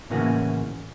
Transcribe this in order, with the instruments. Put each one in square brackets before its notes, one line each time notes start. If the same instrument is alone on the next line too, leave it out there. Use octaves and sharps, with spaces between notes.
[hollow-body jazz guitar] A2 C#3 E3 A#3 C#4 F#4